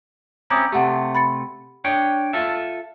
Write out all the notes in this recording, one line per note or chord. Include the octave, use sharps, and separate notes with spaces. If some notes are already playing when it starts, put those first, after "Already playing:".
C4 C#4 E4 A#5 D6 D#6
C3 A3 G4 F#5
B5 A6 C#7
D4 C#5 G5
F4 A4 E5